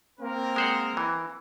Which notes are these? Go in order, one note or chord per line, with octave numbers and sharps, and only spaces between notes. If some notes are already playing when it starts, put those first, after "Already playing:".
A#3 C4 A#4
G#3 C5 F#5
E3